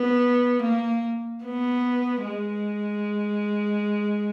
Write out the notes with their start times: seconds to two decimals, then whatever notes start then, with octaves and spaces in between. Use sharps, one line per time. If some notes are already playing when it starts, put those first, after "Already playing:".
Already playing: B3
0.62 A#3
1.44 B3
2.24 G#3